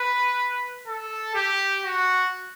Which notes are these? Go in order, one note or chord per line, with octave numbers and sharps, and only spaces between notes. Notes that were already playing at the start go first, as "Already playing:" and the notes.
Already playing: B4
A4
G4
F#4